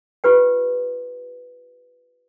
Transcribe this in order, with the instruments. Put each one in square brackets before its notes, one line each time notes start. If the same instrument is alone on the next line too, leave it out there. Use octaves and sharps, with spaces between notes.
[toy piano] F4 G4 B4 G5